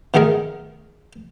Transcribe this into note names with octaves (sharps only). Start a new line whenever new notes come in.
B2 D#3 A3 G#4 A#4